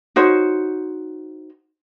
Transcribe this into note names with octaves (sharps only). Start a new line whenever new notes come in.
D#4 F#4 C5 C#5